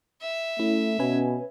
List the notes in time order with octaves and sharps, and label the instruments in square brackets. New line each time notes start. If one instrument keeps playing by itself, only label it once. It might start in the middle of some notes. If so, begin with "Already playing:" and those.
[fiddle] E5
[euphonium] A3 [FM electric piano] C#4 E4
[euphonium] B2 [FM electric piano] C#4 B4 G#5